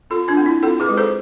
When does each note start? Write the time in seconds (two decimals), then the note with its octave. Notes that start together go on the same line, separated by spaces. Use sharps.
0.10 C4 F4 A4
0.28 D4 F4
0.37 C4
0.46 E4
0.63 C4 F4 A4
0.80 G#4 B4
0.89 G#3
0.97 A4 C5